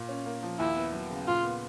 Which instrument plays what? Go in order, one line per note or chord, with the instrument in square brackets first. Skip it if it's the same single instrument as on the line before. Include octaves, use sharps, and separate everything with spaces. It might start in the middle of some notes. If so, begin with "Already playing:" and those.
Already playing: [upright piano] A#2
C#4
A#3
F3
[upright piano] D#2 [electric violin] E4
[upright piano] B3
F#3
C#3
[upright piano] A#2 [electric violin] F4
[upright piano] B3